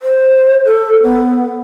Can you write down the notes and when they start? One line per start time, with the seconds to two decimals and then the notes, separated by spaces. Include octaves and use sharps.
0.02 C5
0.65 A4
1.03 B3